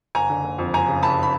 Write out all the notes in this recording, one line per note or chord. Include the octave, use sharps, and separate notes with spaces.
F#1 G#5 A#5
D3
F#1
F2
F#1 G#5 A#5
C#3
F#1 A5 B5
B5